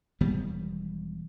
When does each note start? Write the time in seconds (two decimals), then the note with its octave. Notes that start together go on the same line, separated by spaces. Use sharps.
0.21 E1 D#3 G3 B3